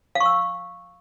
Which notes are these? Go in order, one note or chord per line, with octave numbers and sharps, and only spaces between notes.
F5
C#6
E6